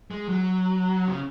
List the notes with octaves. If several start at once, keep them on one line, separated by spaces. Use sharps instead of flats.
G#3
F#3
C#3